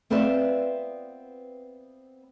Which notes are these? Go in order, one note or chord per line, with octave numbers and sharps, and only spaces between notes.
B3 C4 F4 B4 D5 E5